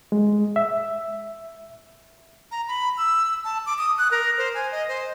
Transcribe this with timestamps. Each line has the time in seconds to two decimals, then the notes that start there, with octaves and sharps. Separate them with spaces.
0.12 G#3
0.56 E5
2.51 A#5
2.68 B5
2.97 E6
3.44 A5
3.66 D6
3.78 D#6
3.98 F#6
4.11 A#4
4.38 C5
4.54 G#5
4.72 D#5
4.88 C5